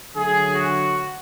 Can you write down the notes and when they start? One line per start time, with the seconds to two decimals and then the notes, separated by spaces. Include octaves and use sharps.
0.15 D3 F#3 A3 G#4
0.55 F#4